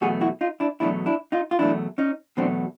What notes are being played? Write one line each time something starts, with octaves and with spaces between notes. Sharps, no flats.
E2 B2 F#3 A3 F#4 G#4
E4 F#4
D#4 F4
D4 E4
E2 B2 F#3 A3 D4 E4
D4 E4
D#4 F4
F4
E2 B2 F#3 A3 D4 E4
C#4 D#4
E2 B2 F#3 A3 C4 D4